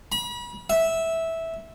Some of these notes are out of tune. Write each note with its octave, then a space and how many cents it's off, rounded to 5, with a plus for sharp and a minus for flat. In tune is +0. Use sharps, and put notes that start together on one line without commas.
B5 -35
E5 -10